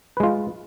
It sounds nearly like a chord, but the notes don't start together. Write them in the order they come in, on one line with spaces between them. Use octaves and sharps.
B4 G#3 F4